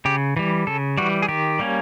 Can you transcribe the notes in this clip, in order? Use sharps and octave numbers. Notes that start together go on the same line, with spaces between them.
C#3 G4
E3 G3
C#3 A4
E3 G3 F#4
G#4
D#3 G4
G3 A#3 C#4